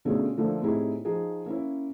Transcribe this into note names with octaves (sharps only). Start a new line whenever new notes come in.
B2 D3 A3 C#4 F4 G#4
D3 F3 A3 A#3 D4
A2 C3 D#4 E4 G#4
F3 D#4 G#4
A#3 C#4 E4